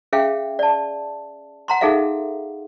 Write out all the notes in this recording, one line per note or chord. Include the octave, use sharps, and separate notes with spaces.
C#4 G#4 E5 F5 G5
D5 A5
F#5 A#5 C6
D#4 G#4 A4 E5 F5